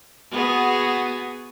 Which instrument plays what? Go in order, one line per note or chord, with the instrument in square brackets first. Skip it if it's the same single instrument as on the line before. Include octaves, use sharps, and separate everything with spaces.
[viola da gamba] B3 F#4 G#4